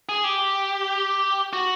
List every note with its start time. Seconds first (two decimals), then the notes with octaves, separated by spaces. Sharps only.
0.09 G#4
0.24 G4
1.53 F#4